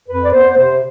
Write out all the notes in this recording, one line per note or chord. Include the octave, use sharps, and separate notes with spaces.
F2 B4
D5
B3 C5
C3 C5